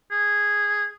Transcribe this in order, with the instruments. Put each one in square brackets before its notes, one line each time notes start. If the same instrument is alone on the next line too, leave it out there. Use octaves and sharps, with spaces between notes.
[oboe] G#4